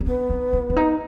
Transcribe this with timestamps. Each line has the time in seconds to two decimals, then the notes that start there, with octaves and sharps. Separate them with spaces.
0.01 C#4
0.06 B3 D4
0.30 D#4
0.53 E4
0.70 D4
0.76 D#4